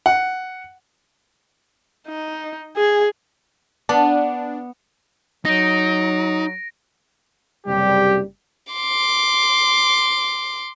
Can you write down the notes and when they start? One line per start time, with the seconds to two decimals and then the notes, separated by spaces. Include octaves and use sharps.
0.06 F#5
2.08 D#4
2.77 G#4
3.89 B3 D4
5.45 F#3 D#4 A#6 D7
7.67 F#1 C3 G3 G4
8.73 C6 D6